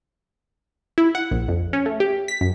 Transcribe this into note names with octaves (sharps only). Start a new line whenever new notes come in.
E4
F#5
A#1
F2
C#4
A3
G4
B6
F#2